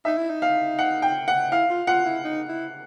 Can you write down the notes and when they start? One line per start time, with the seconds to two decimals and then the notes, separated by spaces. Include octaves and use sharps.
0.05 D#4 E5
0.17 E4
0.30 D#4
0.42 F5
0.79 F#5
1.02 G5
1.28 F#5
1.52 E4 F5
1.70 F4
1.87 F4 F#5
2.05 E4
2.24 D#4
2.49 E4